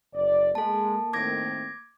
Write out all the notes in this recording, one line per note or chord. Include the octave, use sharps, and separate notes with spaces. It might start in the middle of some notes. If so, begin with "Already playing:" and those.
F#1 D5
G#3 A#3 A4 A5
A2 D#3 C4 D6 G#6 A#6